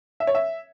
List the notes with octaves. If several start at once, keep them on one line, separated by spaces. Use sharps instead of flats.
E5
C#5
E5